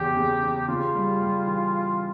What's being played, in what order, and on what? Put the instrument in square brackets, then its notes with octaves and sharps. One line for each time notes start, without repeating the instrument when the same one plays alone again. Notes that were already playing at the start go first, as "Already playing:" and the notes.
Already playing: [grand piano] E2 C#3 [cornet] G4
[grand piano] C#3
C#3
[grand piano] C#3 [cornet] F4
[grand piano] G3
G3
E3